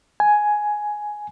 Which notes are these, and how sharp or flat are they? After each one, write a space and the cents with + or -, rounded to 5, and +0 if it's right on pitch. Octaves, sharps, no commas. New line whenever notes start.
G#5 +10